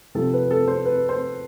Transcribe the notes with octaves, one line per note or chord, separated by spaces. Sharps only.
C3 F3 A4
B4
A4
C5
B4
C5